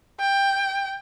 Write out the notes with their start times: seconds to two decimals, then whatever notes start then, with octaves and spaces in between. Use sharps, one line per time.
0.20 G5